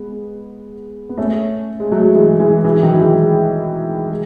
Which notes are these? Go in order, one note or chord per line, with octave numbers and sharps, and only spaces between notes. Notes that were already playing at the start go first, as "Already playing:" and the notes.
Already playing: G#3 B3
B3
A3 C#4
G#3
F#3 A3
E3 G#3
E3 G#3
E3
D#3 F#3
E3 G#3
G#3